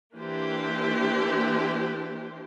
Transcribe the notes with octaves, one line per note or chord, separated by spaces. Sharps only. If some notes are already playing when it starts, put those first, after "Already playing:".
E3 A#3 D4 G4 C5